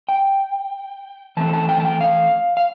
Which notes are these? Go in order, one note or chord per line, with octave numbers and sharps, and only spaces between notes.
G5
E3 A3 C4 A5
A5
G5
A5
G5
F5
F5